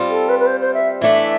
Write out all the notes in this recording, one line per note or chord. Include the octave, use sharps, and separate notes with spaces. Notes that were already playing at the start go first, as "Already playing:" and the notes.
Already playing: G3 C4 F4
A4
B4
B4
C5
C5
E5
E3 A3 D4 E5